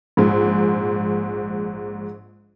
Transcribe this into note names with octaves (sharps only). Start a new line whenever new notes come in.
A#1 G#2